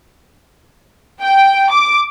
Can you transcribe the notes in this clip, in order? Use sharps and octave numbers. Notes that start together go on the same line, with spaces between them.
G5
D6